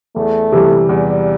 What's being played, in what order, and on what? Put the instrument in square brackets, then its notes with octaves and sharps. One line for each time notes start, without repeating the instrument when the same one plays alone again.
[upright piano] E2 [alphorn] A3
[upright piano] C3 E3 G3
[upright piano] E2 [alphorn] G3